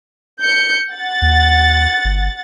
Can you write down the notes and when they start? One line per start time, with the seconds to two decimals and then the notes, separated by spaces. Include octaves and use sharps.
0.40 G6 C#7
0.92 F#5 A6
1.22 D#2
2.05 G1